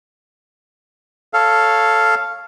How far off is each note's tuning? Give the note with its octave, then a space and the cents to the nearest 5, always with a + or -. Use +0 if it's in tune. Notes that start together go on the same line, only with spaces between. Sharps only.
A4 +0 C#5 -5 F5 -5